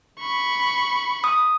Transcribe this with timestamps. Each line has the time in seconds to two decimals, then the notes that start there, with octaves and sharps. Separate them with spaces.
0.20 B5 C#6
1.24 D#6